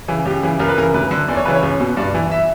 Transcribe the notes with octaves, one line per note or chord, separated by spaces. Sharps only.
C#3 E3
C#2 G4
C#3 E3
C#2 A#4
B4
C#3 E3 A#4
D2 B4
D3
E2 D5
C#5
C#3 E3 B4
C#5
C#2
B2
G2 D5
E3
E5